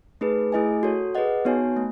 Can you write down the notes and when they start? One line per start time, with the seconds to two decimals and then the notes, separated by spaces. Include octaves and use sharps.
0.21 A3 D#4 G#4 B4
0.52 A3 E4 G#4 D#5 G#5
0.83 F#4 A4 C#5
1.15 G#4 B4 D#5 F#5
1.45 B3 D#4 F#4 C#5 G#5
1.77 A3